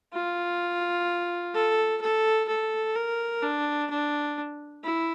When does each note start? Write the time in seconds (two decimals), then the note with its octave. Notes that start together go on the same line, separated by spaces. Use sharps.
0.13 F4
1.54 A4
2.01 A4
2.48 A4
2.95 A#4
3.42 D4
3.90 D4
4.83 E4